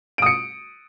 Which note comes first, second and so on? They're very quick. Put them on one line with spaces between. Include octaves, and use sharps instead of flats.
D7 D#6 C#7